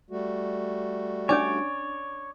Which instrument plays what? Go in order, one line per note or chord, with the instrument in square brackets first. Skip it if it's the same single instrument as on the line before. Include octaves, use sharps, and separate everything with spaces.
[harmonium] G3 A3 F#4
[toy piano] C#4 D4 G#5 [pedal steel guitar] C#5 [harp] D5